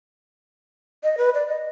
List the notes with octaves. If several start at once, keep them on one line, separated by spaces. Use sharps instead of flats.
D#5
B4
D5
D#5